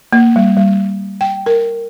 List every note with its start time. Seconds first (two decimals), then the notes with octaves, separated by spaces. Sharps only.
0.13 A#3
0.36 G3
0.57 G3
1.21 G5
1.46 A#4